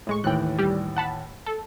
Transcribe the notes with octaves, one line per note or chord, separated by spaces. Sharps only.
A2 G#3 C#6
D#2 A2 E3 G5 F#6
G3 G4
F#5 A5 B5
A4